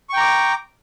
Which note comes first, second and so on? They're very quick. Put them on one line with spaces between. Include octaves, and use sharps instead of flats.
C#6 G5 A#5 D6